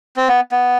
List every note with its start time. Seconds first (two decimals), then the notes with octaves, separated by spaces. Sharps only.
0.16 C4
0.28 B3
0.52 B3